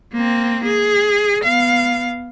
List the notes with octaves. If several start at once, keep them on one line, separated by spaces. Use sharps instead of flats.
A#3 C4
G#4
B3 F5